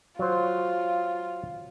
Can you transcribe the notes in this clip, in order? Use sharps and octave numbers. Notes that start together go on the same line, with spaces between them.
F#3 F4 C5